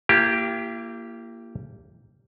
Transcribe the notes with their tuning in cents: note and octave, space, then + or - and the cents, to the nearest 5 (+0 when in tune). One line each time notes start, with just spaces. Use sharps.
A#3 +0 E4 +45 G4 +0